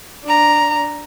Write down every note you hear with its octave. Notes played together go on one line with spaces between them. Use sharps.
D4 A#5